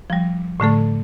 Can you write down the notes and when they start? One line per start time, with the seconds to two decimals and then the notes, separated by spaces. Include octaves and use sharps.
0.10 F3 G3
0.60 A2 D3 A3 A4